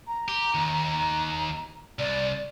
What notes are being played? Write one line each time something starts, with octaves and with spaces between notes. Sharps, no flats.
A#5
G4
D#2 D#3
C2 D5